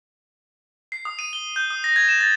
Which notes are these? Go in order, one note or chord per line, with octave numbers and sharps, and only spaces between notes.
C7
D#6
D#7
G7
G6
D#6
A#6
G#6
E7
A6